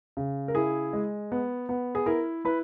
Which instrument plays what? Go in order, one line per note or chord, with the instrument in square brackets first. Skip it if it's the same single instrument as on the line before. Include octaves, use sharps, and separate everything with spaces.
[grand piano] C#3
A#4
E4 G#4
G#3
B3
B3
G#4
E4 A#4
E4 B4